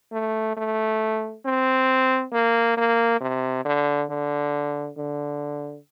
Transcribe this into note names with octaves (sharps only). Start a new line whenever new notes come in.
A3
A3
C4
A#3
A#3
C3
D3
D3
D3